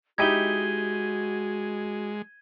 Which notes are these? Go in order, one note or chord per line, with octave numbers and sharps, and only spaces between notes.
G#3 D#4 E4 F#4 G4 G#6 D#7 G7